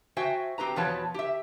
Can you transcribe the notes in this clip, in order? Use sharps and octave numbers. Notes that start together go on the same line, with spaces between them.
F#4 C5 E5 G5 G#5
C4 G4 B4 A#5
E2 B2 F3 B4 C#5 A5
G4 E5